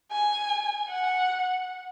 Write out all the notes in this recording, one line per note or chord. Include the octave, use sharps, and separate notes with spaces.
G#5
F#5